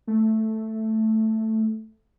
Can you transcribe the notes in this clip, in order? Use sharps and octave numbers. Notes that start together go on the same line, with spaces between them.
A3